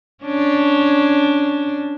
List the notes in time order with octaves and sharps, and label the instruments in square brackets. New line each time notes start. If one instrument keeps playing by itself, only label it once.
[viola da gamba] C#4 D4